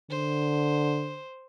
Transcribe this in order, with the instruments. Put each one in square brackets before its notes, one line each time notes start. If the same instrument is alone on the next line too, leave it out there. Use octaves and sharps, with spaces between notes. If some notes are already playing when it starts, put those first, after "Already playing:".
[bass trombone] D3 [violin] C5